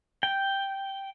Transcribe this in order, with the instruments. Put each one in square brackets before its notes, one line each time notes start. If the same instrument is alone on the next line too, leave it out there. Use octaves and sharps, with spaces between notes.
[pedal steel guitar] G5